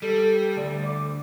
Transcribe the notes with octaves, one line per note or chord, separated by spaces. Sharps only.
G3 A4
D2 D5
D6